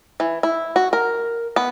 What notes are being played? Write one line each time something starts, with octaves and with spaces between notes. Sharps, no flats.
E3
E4
F#4
A#4
B3